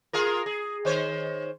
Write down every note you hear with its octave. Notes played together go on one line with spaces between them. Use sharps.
F4 G#4 A#4
G#4
D#3 C5 C#5